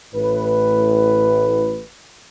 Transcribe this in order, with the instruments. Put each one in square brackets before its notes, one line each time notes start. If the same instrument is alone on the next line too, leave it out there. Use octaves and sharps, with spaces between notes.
[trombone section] A1 A2 B4